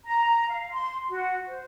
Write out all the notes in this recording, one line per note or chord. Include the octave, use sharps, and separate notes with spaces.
A#5
F5
C6
F#4
C5